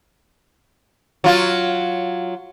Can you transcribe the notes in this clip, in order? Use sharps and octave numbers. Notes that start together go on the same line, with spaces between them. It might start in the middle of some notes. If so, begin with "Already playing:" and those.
F#3 F4